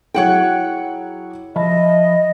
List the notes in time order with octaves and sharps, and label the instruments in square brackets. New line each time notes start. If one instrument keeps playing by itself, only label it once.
[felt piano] F#3 E4 G#4 [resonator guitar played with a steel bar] C#5 F#5 G5
[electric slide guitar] F3 E5 A5 [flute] D#5 [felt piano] B5